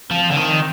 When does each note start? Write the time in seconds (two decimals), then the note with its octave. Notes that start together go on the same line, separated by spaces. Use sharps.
0.11 F3 C4
0.32 D3
0.37 D#3